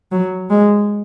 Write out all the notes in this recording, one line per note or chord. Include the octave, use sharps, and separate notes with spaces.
F#3
G#3